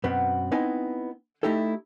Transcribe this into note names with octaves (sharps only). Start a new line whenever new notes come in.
F#2 B2 B3 C4
B3 C4 D#4 E4 D#5 G#5
A3 D#4 E4 G4 A4